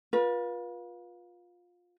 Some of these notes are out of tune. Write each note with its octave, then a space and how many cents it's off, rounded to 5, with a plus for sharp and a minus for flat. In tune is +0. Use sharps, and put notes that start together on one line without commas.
F4 +20 B4 -35